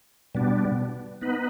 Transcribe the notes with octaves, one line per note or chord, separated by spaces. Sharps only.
B2 G3 B3 D4
B3 D#4 B4